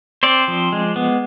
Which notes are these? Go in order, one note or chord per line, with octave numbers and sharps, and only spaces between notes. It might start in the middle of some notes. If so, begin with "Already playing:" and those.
C4 C5 D5
F3
G#3
B3